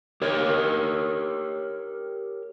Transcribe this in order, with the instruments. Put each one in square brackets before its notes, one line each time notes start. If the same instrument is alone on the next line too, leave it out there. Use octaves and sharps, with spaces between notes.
[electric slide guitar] G4 A#4 C#5